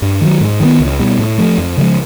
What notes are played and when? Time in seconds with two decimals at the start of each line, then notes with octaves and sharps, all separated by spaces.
0.02 G2
0.21 D#3 F#3
0.41 G#2
0.60 D#3 F#3 B3
0.80 C#2
0.99 B2 G3
1.19 A2
1.38 F3 A3
1.58 F2
1.77 C#3 F3 G#3